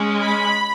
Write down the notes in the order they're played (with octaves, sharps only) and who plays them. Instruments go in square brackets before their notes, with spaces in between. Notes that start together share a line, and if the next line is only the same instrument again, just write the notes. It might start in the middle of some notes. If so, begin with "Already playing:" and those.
Already playing: [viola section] G#3 C#4
B5